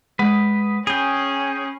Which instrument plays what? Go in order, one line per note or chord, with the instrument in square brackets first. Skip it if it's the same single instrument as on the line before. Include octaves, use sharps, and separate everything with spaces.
[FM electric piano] G#3 F#5 D#6 [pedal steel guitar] B4
[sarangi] C#4 [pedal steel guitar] G#4 G5 [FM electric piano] B5 C7